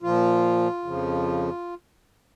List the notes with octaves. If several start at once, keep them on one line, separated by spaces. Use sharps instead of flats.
A#2 F3 F4
F2 C#3 F3